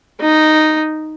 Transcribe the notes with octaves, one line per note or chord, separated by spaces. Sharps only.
D#4